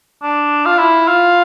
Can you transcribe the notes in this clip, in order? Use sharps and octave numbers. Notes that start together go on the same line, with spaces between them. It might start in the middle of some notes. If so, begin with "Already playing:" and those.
D4
F4
E4
F4